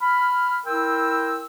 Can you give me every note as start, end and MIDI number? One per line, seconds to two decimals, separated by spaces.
0.02 0.60 83
0.02 0.60 89
0.67 1.46 64
0.67 1.46 70
0.67 1.46 79
0.67 1.46 84
0.67 1.46 88